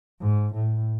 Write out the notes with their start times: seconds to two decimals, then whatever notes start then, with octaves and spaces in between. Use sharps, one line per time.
0.21 G#2
0.54 A2